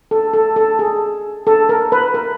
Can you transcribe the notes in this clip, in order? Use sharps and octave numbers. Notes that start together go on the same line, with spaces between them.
A4
A4
A4
G#4
A4
A#4
B4
A#4